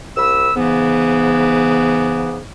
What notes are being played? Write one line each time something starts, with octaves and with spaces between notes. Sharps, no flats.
C2 B5 E6
G#2 C#3 E3 B3